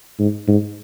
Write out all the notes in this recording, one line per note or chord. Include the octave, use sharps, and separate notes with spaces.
G#2
G#2